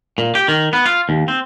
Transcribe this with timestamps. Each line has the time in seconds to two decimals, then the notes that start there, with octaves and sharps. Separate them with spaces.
0.18 A#2
0.35 G4
0.48 D#3
0.73 B3
0.86 F4
1.09 D#2
1.28 C4